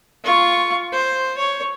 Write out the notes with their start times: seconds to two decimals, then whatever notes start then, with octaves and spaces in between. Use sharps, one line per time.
0.24 F4 C#6
0.92 C5
1.38 C#5